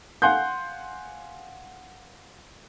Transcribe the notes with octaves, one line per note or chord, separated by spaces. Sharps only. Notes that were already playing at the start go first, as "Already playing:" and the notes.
F5 F#5 G#5 C6 F#6 G6